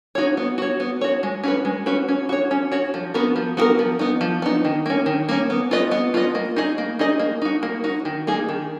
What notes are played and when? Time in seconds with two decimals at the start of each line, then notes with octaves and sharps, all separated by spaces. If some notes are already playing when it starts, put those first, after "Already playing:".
0.15 D#4 F#4 C#5
0.37 B3
0.58 F#4 C#5
0.80 B3
1.01 F#4 C#5
1.23 G#3
1.44 C#4 F#4 B4
1.65 G#3
1.86 C#4 F#4 B4
2.08 C#4
2.29 F#4 C#5
2.51 C#4
2.72 F#4 C#5
2.94 F3
3.14 B3 F#4 A#4
3.36 F3
3.57 B3 F#4
3.61 A#4
3.79 F3
3.99 B3 D#4
4.21 F3
4.42 B3 D#4
4.65 D#3
4.86 A#3 C#4
5.06 D#3
5.29 A#3 C#4
5.50 B3
5.71 F4 B4 D#5
5.91 B3
6.14 F4 B4 D#5
6.35 A#3
6.56 D#4 G#4 D#5
6.78 A#3
6.99 D#4 G#4 D#5
7.19 A#3
7.42 D#4 F#4
7.63 A#3
7.84 D#4 F#4
8.05 D#3
8.27 A#3 D#4 G#4
8.49 D#3